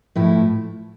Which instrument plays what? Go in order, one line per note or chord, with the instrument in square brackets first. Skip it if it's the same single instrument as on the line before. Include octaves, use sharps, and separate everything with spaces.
[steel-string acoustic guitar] A2 F3 A3 E4